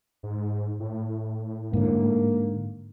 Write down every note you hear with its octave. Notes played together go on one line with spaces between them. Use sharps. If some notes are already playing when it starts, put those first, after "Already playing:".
G#2
A2
G#2 D3 A#3